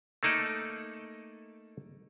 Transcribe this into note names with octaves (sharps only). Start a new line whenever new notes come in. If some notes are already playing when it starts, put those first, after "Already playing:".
A3 A#3 D#4 A4 D5